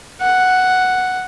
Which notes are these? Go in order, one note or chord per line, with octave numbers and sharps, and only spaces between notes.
F#5